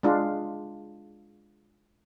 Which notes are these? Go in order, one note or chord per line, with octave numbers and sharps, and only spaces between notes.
G#3 D4 F4